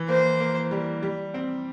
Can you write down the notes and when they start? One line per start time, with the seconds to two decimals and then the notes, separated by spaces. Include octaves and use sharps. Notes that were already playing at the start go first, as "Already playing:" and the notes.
Already playing: E3
0.09 A#3 C5
0.40 A#3
0.71 G3
1.03 G3
1.34 C4